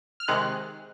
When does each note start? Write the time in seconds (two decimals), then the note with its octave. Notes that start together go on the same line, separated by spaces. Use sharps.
0.20 F6
0.28 C3 D#3 G#3 F#6